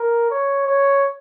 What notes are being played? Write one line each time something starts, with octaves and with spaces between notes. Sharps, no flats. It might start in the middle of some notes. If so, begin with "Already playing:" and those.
Already playing: A#4
C#5
C#5